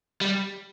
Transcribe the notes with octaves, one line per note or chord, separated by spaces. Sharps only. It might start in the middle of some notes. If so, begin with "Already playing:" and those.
G3